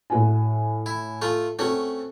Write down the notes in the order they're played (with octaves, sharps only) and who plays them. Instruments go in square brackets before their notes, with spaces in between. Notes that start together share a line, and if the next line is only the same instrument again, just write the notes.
[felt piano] A2 F#4 G#5
[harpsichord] E4
A3 F4
[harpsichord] A3 C#4 [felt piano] C4 F#4